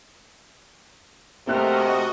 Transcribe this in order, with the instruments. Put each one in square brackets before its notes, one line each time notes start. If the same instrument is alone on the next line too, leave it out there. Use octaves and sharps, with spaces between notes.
[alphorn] C3 [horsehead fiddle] A3 A#4 [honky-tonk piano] A#3 F#6 [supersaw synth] F#4 D#5